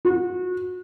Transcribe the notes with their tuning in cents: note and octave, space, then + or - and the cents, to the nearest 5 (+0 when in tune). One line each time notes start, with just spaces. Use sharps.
F#4 -25